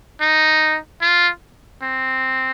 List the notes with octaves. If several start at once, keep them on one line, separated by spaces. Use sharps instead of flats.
D#4
F4
C4